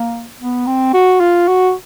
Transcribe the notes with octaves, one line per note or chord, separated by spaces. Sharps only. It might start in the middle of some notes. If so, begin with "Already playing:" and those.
Already playing: A#3
B3
C4
F#4
F4
F#4